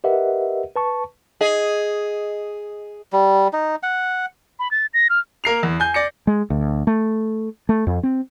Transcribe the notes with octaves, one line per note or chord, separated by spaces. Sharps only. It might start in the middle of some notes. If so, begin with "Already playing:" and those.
G4 A#4 B4 D#5 E5 F#5
B4 A5 C#6
G#4 D#5
G3
D#4
F#5
B5
A6
A#6
F6
A#3 A#4 C7 F7
E2
G#5 G6
D5 A#6 C#7
G#3
D2
A3
A3
F2
C4